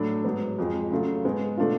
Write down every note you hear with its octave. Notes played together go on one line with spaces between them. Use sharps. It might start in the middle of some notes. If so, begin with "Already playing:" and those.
Already playing: A2 F#3 A3 D4
G#2 F#3 B3
F2 F3 G#3
C#3 F#3 A3 F4
G#2 G#3 B3
B2 A3 D4 F4